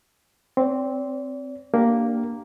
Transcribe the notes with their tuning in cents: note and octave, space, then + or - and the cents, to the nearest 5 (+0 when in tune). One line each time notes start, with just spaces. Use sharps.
C4 +0 D5 -40
A#3 +0 D4 +0 G4 -20